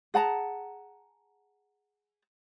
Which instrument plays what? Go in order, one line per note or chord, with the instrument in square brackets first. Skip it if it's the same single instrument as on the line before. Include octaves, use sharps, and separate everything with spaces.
[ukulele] G#4 F#5 A5 A#5